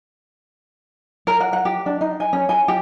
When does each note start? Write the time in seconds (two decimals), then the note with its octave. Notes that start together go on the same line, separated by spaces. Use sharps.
1.27 A#4
1.40 F#5
1.53 F#5
1.65 G4
1.86 D4
2.01 D#4
2.20 G#5
2.33 C#4
2.49 G#5
2.68 G4